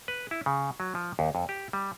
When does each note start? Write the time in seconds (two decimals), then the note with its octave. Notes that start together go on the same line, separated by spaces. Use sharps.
0.08 B4
0.31 E4
0.46 C#3
0.80 F#3
0.95 F3
1.19 D#2
1.35 F2
1.49 G4
1.73 G3